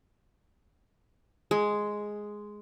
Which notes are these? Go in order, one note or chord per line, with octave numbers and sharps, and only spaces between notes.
G#3